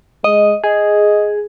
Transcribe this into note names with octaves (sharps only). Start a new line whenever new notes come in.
G#3 D#5
G#4 D#5